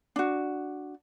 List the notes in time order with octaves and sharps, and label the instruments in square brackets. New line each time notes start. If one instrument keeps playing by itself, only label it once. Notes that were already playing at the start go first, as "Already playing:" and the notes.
[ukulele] D4 F#4